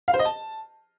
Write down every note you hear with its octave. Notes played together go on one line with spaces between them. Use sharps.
F5
C5
D#5
A5